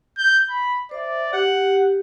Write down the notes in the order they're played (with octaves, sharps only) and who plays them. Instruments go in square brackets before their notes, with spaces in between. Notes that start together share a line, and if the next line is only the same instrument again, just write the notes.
[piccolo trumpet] G6
B5
[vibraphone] C5 E5 [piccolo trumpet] D5
[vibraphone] G4 [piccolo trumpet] F#5